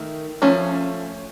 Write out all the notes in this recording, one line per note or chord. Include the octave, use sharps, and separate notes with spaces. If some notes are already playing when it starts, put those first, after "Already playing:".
Already playing: D#3 A3
F3 A3 C#4